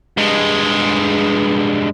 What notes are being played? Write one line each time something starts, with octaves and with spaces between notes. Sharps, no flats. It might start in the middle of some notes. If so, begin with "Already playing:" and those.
G2 G#3